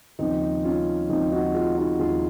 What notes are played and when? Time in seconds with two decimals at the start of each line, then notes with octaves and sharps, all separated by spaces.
0.19 D#2 C#3 F3 C4 D#4
0.64 C#4 F4
1.09 D#2 C#3 F3 C4 D#4
1.32 D#4 F#4
1.54 F4 G#4
1.77 D#4 F#4
1.99 D#2 C#3 F3 F4 G#4